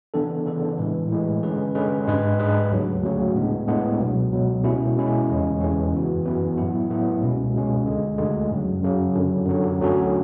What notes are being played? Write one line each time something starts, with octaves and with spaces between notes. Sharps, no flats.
C#3 E3 B3 D4 A4
C#3 E3 B3 D4 A4
A2 E3 G#3
A2 E3 G#3
D3 G#3 C#4 G#4 B4
D3 G#3 C#4 G#4 B4
G#2 G#3 D4 G#4 B4
G#2 G#3 D4 G#4 B4
D2 C#3 F#3
D2 C#3 F#3
A2 G#3 B3 D4
A2 G#3 B3 D4
C#2 B2 F#3
C#2 B2 F#3
B2 G#3 C#4 E4
B2 G#3 C#4 E4
E2 C#3 E3 G#3 C#4
E2 C#3 E3 G#3 C#4
F#2 E3 B3 F#4
F#2 E3 B3 F#4
A2 F#3 B3 E4
A2 F#3 B3 E4
C#2 B2 G#3 C#4
C#2 B2 G#3 C#4
D2 D3 G#3
D2 D3 G#3
F#2 C#3 F#3
F#2 C#3 F#3
F#2 D3 F#3
F#2 D3 F#3
D2 D3 F#3 C#4 F#4